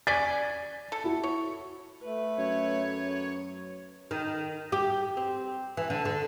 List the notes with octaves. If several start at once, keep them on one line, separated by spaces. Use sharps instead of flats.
C#4 D5 G#5 A6 B6
A4
E4 F#4
C#5
A3 B4
F#2 C#5
D#3
G4
C4
E3
D3
D3